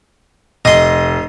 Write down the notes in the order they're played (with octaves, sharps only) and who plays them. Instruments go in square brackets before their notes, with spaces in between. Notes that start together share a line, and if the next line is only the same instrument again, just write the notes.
[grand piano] F1 [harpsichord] D#5 C6